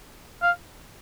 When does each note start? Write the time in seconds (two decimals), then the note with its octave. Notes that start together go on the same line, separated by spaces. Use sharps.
0.42 F5